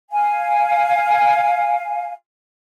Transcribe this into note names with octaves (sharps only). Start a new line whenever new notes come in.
F5 G#5